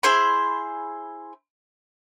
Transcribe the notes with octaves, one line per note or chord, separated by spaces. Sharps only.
E4 G#4 C5 B5